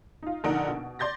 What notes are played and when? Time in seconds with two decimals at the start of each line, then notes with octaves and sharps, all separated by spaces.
0.23 D#4 F4
0.44 A#1 D3 D#4 A#4 F#5 D7
0.68 B2
0.99 D5 C6 G6 A6 A#6